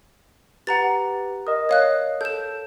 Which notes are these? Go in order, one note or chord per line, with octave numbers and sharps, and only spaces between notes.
G4 B4 F#5 A#5 A6
A#4 D#5 D#6
C#5 F5 F#6
A4 G6 E7